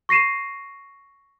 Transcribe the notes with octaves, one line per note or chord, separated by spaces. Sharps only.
C#6 A#6 C7 D#7 E7